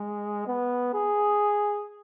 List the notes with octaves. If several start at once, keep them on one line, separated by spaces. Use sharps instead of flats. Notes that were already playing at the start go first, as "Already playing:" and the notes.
Already playing: G#3
B3
G#4